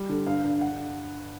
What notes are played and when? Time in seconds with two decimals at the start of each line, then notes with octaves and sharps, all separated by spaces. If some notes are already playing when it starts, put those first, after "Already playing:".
Already playing: G3
0.09 D3
0.27 G2 F5
0.44 G2
0.61 F#5